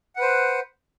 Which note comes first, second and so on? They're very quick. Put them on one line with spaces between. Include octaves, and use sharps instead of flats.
F#5 B4 C5